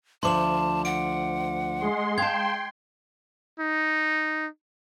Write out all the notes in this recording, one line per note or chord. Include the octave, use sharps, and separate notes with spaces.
D2 F3 A5 C6 D6 F#7
F#5 D7
G#3 C6
F5 G5 A5 C6 G#6
D#4